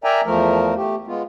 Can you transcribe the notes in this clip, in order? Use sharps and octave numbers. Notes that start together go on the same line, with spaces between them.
A#4 D5 E5 G5 G#5 A#5
E2 F3 A3 A#4
A3 G4
G#3 B3 F4